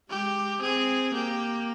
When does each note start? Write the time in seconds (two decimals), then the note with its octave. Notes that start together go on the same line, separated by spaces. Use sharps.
0.10 G#3 G4
0.62 C4 G#4
1.14 A#3 G4